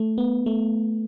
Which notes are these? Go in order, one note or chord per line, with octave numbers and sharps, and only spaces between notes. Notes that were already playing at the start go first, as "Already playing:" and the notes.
Already playing: A3
B3
A3